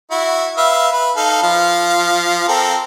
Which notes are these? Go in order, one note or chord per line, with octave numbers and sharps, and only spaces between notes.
E4 F#4
B4 E5 F5
B4
D#4 A4 F5
F3 F5
C4 A4 A#4